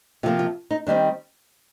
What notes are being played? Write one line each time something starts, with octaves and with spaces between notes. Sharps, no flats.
C3 F3 A#3 F4
F4
D#4
D#3 G3 C4 D4